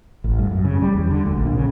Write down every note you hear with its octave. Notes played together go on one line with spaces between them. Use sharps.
A1
G2
F#2
C#3
G3
E2
D3
D2
A#1
C#3